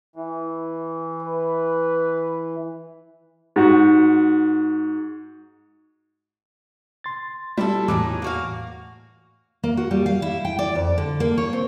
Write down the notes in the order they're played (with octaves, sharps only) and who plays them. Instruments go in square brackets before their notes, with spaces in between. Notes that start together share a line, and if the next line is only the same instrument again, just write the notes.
[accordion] E3
[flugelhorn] B4
[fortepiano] G#2 F#4
[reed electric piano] C6 A6
[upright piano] G3 [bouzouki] E4 G4 A4
[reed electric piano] E2 A2 [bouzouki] F#3 D#4 G#4 [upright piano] D6
[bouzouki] A#3 F#4 F5
[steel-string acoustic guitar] A#3
F#4
G3
F5
E4
G5
D5
F2
D3
A#3
C#5
C4